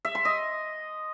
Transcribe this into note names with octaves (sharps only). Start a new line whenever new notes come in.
E5
C6
D#5